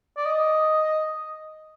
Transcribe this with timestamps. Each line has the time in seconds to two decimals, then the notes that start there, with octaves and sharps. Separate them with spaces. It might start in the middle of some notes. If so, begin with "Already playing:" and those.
0.17 D5
0.26 D#5